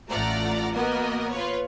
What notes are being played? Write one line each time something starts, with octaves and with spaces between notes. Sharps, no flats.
A1 A3 F4 D5 F#5 A#5
A#3 B3 F#4 A#4 D#5
F4 B4 C#5